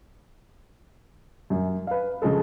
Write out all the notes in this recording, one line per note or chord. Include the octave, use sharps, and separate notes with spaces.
F#2
B4 F5
C#3 F3 G#3 A4